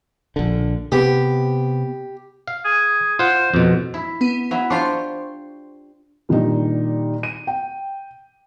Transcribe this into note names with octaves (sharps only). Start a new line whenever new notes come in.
A#1 D3
C3 B3 G4
F5
G#4
F4 C5 F#5
F2 B2
E4
B3 D#7
F#3 E4
D4 F4 G4 C5 C6 C#6
A#2 D#3 G3 D4 D#4
D#7
G5